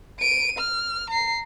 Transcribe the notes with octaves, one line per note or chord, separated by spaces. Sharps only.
D7 D#7
F6
A#5 C7